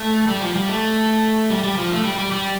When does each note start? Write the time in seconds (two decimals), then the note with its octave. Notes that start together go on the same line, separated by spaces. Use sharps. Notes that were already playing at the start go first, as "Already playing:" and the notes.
Already playing: A3
0.28 G3
0.41 F3
0.55 G3
0.69 A3
1.50 G3
1.64 G3
1.78 F3
1.92 A3
2.04 G3
2.18 G3
2.32 G3